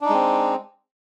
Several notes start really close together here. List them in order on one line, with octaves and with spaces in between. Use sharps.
D4 D#4 G#3 C4